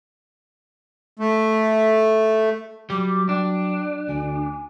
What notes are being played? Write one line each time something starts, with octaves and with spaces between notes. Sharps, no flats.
A3
F#3 G3 D6
D4 G5
D2 G#5